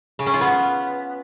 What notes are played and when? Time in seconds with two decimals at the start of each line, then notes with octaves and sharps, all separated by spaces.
0.19 C#3
0.26 C#4
0.34 F4
0.41 B3